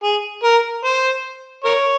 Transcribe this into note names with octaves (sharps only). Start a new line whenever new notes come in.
G#4
A#4
C5
A#4 C#5